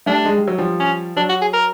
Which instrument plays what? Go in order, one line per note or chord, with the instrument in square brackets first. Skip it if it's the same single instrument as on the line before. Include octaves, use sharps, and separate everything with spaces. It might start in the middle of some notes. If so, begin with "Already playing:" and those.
[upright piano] G3 A3 [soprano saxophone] D4
[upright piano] G#3
G3
F#3
F3 G3
[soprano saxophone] C#4
[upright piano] F#3 [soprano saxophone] D4
[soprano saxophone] F#4
G#4
A#4